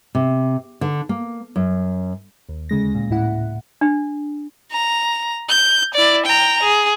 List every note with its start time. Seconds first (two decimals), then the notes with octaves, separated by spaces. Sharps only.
0.15 C3
0.81 D3
1.09 A#3
1.56 F#2
2.49 D#2
2.69 D2 C#3 G#3 A#6
2.95 A#2
3.11 A2 E4 F#5
3.81 D4
4.72 A#5
5.49 G6
5.95 E4 D5
6.26 G5 A#5
6.63 G#4